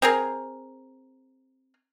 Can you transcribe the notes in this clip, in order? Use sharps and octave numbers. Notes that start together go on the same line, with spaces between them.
C4 G#4 A#4